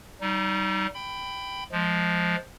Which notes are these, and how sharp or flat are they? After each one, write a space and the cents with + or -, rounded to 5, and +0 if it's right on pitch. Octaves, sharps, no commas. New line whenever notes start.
G3 -30 D#4 +0
G5 +0 B5 +15
F3 +0 G#3 +15